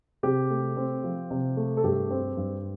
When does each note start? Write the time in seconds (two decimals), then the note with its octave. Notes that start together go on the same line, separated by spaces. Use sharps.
0.23 C3 G4
0.50 A3
0.77 C4
1.04 F3
1.31 C3
1.57 A3
1.77 A4
1.84 G2 G4
2.11 C4
2.37 G2